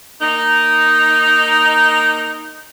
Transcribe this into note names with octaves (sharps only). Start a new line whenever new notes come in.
A#3 D#4